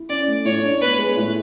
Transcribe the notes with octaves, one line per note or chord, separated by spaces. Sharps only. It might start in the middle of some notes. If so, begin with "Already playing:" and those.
Already playing: E4
C#4 D5
A3
A2 C#5
D4
B3 B4
G#3
A2